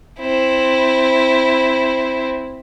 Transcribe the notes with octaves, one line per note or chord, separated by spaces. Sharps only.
C4 E4